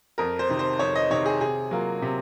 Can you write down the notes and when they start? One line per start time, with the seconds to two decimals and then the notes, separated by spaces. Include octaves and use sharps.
0.18 F2 A#4
0.39 C5
0.49 C3 D#3
0.59 C5
0.79 F2 C#5
0.95 D#5
1.11 C3 D#3 C#5
1.26 G#4
1.41 C3 G#4
1.71 F#3 A#3 F4
2.02 C3